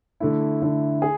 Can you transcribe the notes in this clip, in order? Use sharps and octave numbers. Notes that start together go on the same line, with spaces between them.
D3 A3 E4
D3 A3 E4
G#4